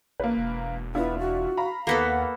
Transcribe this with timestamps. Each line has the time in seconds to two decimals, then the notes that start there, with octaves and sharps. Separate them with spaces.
0.20 A1 A#3 B4
0.37 E1
0.95 B3 D4 E4 F4
1.19 F#4
1.57 F5 A#5 B5
1.87 D#2 A#3 B3 A4 F#5